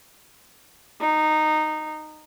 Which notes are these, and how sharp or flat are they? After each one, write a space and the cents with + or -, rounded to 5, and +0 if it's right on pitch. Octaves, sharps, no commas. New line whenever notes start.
D#4 -15